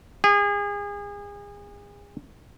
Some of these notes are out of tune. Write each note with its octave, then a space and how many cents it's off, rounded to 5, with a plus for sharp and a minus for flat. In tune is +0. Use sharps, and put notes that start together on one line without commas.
G#4 -30